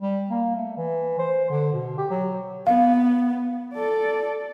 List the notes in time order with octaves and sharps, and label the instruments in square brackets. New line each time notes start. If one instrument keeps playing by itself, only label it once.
[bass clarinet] G3
A#3
A3
E3
C5
D3
B2
G4
F#3
[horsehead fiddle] B3 [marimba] F5
[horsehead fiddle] A4 D5